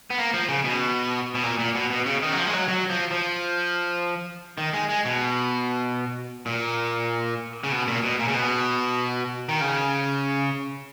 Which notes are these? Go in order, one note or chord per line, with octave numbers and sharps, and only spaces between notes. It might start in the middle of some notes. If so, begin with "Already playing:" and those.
B3
A#3
F3
C#3
B2
B2
A#2
A#2
B2
B2
C#3
D#3
F#3
F3
G#3
F#3
F#3
F3
F3
D#3
G#3
G#3
B2
A#2
C#3
B2
A#2
B2
A#2
C#3
B2
D#3
C#3